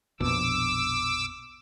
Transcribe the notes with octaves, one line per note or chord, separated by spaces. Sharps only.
A#1 F2 B2 D6 E6